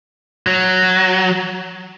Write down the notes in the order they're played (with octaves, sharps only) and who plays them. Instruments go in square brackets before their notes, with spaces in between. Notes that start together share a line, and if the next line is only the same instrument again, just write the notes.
[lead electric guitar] F#3